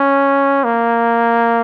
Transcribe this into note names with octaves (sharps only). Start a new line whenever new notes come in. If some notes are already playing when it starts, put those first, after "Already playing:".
Already playing: C#4
A#3